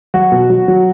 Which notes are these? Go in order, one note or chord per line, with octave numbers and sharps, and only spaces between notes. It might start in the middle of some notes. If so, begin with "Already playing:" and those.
F#3 F#4
B2
F#3
F#3